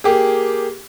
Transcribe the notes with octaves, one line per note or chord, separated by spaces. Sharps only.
A#3 G4 G#4